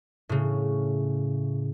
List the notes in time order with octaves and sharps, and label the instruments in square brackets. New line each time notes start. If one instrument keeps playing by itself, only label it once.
[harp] A2 C#3